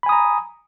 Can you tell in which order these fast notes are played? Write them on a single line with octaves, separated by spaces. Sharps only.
B5 G#5 D#6 A#5